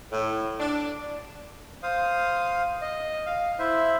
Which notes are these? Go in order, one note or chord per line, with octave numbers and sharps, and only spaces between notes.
A2
D4
C5 F5 D#6
D#5
F5
E4 C5 E5